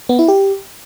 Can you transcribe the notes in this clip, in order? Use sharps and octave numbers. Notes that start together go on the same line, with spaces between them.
B3
E4
G4